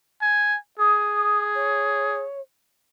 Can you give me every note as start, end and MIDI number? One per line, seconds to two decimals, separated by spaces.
0.22 0.57 80
0.79 2.26 68
0.79 1.42 87
1.55 2.40 73